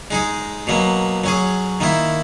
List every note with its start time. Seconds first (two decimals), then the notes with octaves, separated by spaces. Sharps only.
0.11 G#3 D#4 G#4
0.67 B2 F#3 A#3
1.24 F#3 C#4 G#4
1.80 D#3 A#3 E4